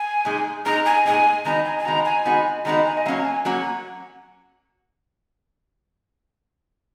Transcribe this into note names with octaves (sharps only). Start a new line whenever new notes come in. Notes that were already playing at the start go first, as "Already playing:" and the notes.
Already playing: G#5
A#2 G#3 D#4
A#2 G#3 D#4 A#5
G#5
A#2 G#3 D#4 G#5
D#3 G#3 B3 D#4 F#4 A#5
G#5
G#5
D#3 G#3 B3 D#4 F#4 A#5
G#5
D#3 G#3 B3 D#4 F#4
D#3 G#3 B3 D#4 F#4 A#5
G#5
D#5
F#3 A#3 C#4 F#4 F5
A#5
G#5
F#3 A#3 C#4 F#4 F#5